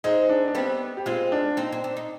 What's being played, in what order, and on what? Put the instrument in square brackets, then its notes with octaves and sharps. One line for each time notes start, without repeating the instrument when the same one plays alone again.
[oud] G#3 C4 [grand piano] D#4
[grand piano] D4
D4
[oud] G3 B3 [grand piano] C4
[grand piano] G4
[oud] G#3 C4 [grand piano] F4
[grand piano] D4
[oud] C4 D#4
C4
D4
D#4